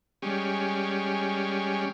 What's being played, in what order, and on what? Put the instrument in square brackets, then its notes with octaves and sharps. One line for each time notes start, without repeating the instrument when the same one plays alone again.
[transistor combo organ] G3 G#3 C#4